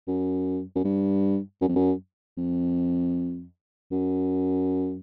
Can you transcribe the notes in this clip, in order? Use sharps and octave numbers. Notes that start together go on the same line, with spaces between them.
F#2
F#2
G2
F#2
F2
F#2
F2
F#2